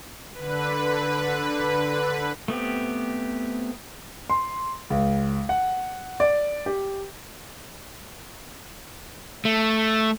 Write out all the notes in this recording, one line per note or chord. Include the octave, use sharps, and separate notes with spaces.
D3 B4
A3 B3 C4 G4
C6
C#2
F#5
D5
G4
A3